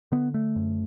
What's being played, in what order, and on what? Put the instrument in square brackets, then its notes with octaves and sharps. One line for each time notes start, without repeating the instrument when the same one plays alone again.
[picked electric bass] D3 B3
A3
F#2